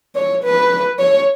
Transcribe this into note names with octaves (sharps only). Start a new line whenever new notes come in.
C#5
B4
C#5